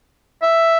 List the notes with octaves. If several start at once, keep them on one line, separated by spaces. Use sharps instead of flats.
E5